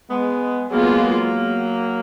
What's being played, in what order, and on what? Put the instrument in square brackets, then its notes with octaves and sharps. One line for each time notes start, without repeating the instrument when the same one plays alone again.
[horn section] G#3 B3
[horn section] F#3 A#3 [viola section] G#3 B3 F4 G#4